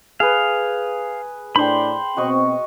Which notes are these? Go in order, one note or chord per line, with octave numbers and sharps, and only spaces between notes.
G#4 B4 F5
A2 D4 C5 G5 B5 C6
B2 C4 F#4 D#5 C#6